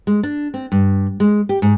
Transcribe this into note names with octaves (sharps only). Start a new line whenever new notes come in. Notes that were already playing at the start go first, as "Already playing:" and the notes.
G#3
D4
C4
G2
G#3
G4
G#2